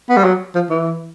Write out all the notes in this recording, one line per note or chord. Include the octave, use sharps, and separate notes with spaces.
B3
G3
F#3
F3
E3